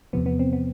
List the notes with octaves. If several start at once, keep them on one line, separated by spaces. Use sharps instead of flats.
E2 C3 F3 B3
B3
C4
B3